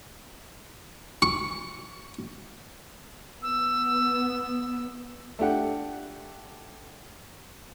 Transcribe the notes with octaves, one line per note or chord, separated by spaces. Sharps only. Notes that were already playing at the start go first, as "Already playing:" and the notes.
C#6
B3 E6
A3 D4 G4 F#5